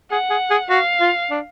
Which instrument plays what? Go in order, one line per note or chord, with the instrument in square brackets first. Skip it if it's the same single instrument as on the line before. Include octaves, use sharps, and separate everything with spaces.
[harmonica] G#4 [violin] F#5
[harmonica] G#4
G#4
[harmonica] F#4 [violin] F5
[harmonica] F4
D4